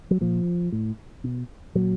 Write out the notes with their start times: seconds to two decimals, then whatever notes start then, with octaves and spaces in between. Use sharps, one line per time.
0.11 F#3
0.21 A#2 F3
0.72 A2
1.24 B2
1.75 A#2 F#3